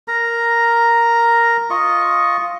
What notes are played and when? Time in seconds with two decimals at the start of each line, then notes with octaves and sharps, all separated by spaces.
0.08 A#4 A#5
1.70 F4 D#5 C#6